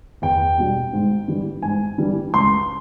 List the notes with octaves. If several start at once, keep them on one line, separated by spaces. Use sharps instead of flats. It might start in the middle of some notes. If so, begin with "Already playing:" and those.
E2 G5
B2 G3
G#2
E3 G3
G#2 G#5
E3 G3
C#2 C6